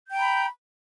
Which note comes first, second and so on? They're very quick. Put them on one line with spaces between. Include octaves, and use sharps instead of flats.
G6 G5 A#5 B5